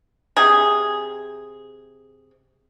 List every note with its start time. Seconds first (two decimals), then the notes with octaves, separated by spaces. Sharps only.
0.36 C3 G#4